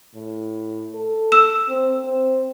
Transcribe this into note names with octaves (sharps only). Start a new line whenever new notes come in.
A2
A4
E6 E7
C4
C4